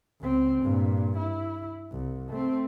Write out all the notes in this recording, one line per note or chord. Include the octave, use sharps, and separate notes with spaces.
C#2 C4
G2 A#2
E4
C2
A3 C4